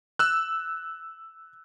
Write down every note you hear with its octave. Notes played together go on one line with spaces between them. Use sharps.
E6 F#6